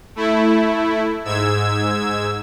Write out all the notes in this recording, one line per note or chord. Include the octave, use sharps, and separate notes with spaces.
A3 E4
G#2 E6 G#6